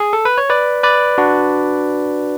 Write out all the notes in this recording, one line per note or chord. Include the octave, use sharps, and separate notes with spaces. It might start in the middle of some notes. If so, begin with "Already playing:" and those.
G#4
A4
B4
C#5
B4 D5
B4 D5
D4 F#4